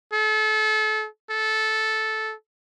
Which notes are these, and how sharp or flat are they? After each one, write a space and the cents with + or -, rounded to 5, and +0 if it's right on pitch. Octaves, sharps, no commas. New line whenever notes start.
A4 -30
A4 -10